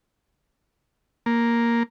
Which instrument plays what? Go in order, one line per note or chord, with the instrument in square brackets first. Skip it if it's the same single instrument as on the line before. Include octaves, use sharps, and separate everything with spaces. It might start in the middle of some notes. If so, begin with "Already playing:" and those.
[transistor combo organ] A#3